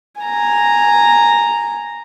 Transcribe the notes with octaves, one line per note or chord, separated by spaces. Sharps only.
G#5 A#5